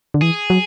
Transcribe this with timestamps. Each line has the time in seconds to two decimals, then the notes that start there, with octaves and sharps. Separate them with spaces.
0.14 D3
0.21 E3 G#4
0.50 F#3